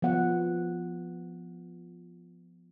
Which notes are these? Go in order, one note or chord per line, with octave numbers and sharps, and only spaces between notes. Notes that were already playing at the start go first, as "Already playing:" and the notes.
F3 B3 F#5